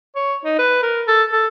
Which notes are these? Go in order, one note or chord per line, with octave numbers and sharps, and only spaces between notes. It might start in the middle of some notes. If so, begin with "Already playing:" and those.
C#5
D#4
B4
A#4
A4
A4